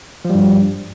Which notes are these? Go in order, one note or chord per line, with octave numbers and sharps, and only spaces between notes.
G2 F3 G3